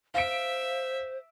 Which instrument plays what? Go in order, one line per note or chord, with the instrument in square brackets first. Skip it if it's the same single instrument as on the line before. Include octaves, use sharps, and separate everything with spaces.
[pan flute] C5 [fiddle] E5 [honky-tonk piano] F5 D7